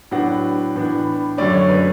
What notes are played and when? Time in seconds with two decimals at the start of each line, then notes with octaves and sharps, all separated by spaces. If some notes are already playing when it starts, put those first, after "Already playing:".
0.11 A2 F#3 B3 D4 F#5
0.76 A2 E3 B3 D4
1.38 F#2 D3 A3 C#4 D5
1.54 C#5
1.69 B4